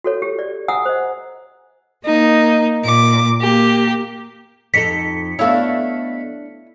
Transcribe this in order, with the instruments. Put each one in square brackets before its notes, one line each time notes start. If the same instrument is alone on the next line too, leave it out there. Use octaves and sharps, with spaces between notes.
[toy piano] F#4 A4 C#5
G4
D5
F#5 G#5 A#5 D#6 E6
C5 D#5
[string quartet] A#3 D#4
A#2 D6
A#3 G4
[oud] F2 D#4 A4 [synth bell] B6 C#7
[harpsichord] B2 A3 [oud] D4 A4 C#5 [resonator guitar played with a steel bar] E4 F5